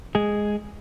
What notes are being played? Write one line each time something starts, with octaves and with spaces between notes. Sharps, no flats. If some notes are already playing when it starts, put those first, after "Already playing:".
G#3 G#4